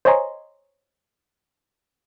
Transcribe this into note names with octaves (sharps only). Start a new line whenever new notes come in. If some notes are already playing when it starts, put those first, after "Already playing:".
C5 C#5 D#5 G#5 A#5 C6